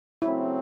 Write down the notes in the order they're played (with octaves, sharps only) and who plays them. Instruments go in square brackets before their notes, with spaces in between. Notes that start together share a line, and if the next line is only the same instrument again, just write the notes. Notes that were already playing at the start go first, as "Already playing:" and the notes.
[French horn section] C#3 F#3 A3 C4 [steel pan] E4